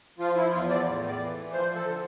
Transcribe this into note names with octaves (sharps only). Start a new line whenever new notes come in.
F3 F4
E4
E2 F4
D5
A2
D5
E3
F3 C5
A4
D3